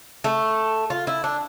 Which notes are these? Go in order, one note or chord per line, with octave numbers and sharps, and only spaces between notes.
A3
F4
E4
D4